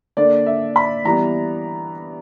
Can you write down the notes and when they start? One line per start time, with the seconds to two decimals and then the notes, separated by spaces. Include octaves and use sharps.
0.17 D3 A#3 D4 D5
0.46 E5
0.76 B5
1.05 E3 G3 B3 A#5